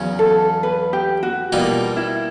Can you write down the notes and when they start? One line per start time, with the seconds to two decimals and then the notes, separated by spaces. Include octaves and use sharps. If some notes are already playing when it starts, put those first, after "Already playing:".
Already playing: E2 C#3 F#3
0.19 A4
0.63 B4
0.93 G4
1.23 F#4
1.52 B2 G3 A#3 D#4 F4
1.97 E4